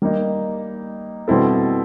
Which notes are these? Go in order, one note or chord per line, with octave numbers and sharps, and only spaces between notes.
G3 A#3 D#4
B2 G3 C4 E4 A4